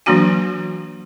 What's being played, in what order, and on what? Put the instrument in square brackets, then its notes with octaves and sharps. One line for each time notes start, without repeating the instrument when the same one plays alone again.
[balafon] E3 F#3 A#3 D4 F#4 G#5